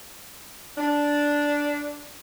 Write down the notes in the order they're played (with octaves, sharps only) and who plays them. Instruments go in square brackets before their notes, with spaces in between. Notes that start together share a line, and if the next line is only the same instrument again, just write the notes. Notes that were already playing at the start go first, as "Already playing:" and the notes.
[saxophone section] D4